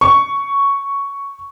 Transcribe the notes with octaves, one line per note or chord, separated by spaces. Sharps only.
C#6